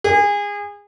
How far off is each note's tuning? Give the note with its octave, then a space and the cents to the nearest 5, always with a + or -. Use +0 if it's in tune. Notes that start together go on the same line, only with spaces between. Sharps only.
G#4 -25